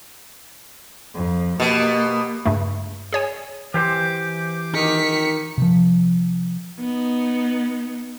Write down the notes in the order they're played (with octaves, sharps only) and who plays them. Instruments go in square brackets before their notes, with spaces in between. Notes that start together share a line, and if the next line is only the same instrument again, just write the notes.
[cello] F2
[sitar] B2 [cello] A#3 G4
[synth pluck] G2 C#3 A3
G#4 C#5 G#5
[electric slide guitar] E3 G4 C5 [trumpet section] D6
[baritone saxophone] D#3 [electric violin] B6 C#7
[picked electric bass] C3 F3
[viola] B3 D#4